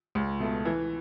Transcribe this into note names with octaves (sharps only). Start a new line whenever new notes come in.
C#2
B2 A3
E3